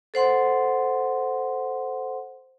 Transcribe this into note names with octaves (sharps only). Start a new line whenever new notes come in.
A4 C5 F#5 C6